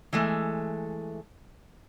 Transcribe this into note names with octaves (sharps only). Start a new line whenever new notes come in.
E3 G#3 A3